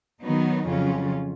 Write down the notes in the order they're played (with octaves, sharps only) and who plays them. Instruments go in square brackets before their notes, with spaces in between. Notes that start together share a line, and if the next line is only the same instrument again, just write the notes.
[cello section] D#3 F#3 B3 D#4
F2 C#3 F#3 C#4 F4